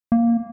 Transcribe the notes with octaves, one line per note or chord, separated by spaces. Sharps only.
A#3